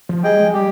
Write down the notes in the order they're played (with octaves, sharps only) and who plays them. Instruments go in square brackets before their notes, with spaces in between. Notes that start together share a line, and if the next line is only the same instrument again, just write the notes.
[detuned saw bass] F3
[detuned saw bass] G3 [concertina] G#4 D#5 G5
[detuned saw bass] G#3
[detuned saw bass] G3 [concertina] G4